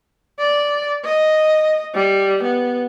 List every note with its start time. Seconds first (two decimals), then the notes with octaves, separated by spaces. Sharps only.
0.39 D5
1.05 D#5
1.95 G3
2.44 B3